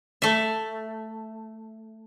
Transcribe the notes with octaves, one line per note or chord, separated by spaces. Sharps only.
A3 E5